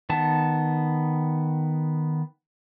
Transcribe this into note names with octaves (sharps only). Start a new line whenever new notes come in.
D#3 B3 A5